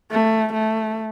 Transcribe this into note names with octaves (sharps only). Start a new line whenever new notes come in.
A3
A3